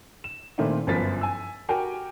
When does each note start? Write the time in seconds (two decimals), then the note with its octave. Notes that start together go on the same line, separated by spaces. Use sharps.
0.24 E7
0.58 A#2 D#3 A3 C4 D4 E4
0.87 G1 F#2 F3 B3 A6 B6
1.21 G#5 E6
1.69 F#4 G4 A#4 G5 G#5